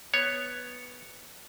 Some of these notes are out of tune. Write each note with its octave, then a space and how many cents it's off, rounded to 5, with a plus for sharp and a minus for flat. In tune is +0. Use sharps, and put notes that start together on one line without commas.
B3 +0 C#5 +0